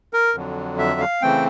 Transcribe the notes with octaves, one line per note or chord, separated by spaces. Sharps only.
A#4
F2 D3 F#3
E5
F5
C#3 E3 A3 C4 G5